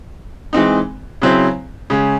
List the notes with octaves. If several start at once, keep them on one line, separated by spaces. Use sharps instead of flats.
E3 G#3 C4 D#4
C#3 F#3 C4 E4 C5
C#3 G#3 C#4